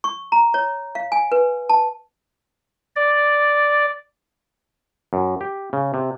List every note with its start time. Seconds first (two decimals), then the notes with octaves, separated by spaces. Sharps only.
0.04 C#6
0.32 A#5
0.54 C#5
0.95 F5
1.12 G#5
1.32 B4
1.69 A5
2.96 D5
5.13 F#2
5.41 G4
5.73 C#3
5.94 C3